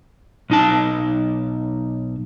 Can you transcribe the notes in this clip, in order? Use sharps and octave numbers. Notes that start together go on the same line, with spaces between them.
B1 D#4 A5